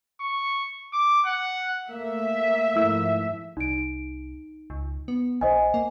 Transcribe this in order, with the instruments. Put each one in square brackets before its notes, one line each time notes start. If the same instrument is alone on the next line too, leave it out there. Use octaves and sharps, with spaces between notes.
[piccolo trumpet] C#6
D6
F#5
[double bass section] A3 [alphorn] A#3 [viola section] E5
[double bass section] G#2 F3 [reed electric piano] A3 E4 E6
[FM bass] C2 [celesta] D#4 D7
[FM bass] C#2
B3
[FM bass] A#1 [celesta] C5 D#5 G#5
[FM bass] A#3